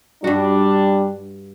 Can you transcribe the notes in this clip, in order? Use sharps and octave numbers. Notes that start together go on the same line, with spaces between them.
G2 G3 D4 F#4